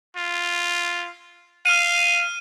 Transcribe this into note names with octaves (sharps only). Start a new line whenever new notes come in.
F4
F5 F6 D#7